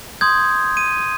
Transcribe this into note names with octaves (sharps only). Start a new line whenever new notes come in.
C6 D#6 G6 G#6
D#7